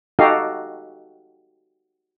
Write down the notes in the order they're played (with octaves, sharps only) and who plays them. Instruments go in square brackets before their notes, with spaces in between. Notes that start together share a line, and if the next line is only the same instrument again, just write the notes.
[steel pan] D#4 F#4 G4 A4 D#5 F5